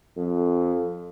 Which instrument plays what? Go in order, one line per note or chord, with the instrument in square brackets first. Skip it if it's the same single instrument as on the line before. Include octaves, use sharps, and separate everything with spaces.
[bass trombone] F2